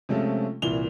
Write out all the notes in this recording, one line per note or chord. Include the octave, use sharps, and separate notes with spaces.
C3 F3 G#3 A3 C#4 F4
C2 A#2 E3 F7 G7